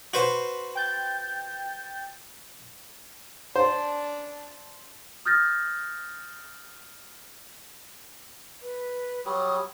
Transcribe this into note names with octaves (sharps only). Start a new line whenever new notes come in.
F#4 B4 C5
G5 G6 A6
D4 C5 D5
D#6 F6 G6 A6 A#6
B4
F#3 G3 D#6